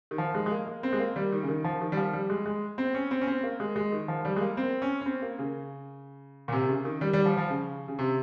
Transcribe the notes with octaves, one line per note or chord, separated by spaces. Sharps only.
D#3
F3
G#3
G#3
A#3
A#3
C4
G#3
A#3
G3
D#3
C#3
D#3
F3
D#3
G3
F3
G3
G#3
G#3
C4
C#4
C4
C#4
C4
A#3
G#3
G#3
D#3
F3
G3
G#3
A#3
C4
C#4
C#4
C4
A#3
C#3
A#2
C3
C#3
D#3
G3
G3
F3
F3
C#3
C#3
C3